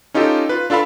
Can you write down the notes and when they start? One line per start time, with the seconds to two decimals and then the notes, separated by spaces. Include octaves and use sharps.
0.14 C#4 D#4 F4 G4 A4
0.49 F4 B4
0.70 D4 F4 A4 F5 B5